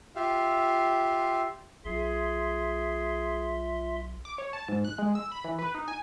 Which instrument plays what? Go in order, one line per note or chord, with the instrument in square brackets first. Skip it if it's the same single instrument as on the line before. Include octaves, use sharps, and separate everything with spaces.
[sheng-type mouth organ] F4 G4 E5 F5
[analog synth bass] B1 [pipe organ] F4 E5 C6 [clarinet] G#4
[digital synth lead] D6
C#5
A5
G#2
F#6
G#3
E6
B5
E3
B4
D#4
G#5